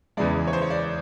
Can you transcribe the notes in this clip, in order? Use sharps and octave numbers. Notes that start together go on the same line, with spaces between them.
E2 C#3 E3 G#3 D5
C#5
C5
C#5
D5